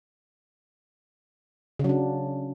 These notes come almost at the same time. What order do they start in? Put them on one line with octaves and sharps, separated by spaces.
C#3 F#3 D4